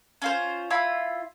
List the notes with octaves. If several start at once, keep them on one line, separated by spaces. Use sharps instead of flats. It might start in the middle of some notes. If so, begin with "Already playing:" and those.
C#4 F4 C5
E4 F4 B5